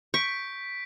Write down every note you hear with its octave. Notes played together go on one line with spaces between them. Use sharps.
C#6 G6 B6 D7